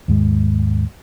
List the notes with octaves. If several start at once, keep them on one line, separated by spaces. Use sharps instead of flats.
D#2 G#2 G#3